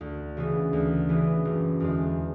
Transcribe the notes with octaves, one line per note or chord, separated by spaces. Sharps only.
D2
C#3 E3 B3
D2
C#3 E3 B3
F#1
E2 D3 G#3